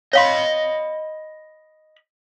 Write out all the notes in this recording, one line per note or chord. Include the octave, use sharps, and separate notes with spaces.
C#5 D#5 F5 B5 C6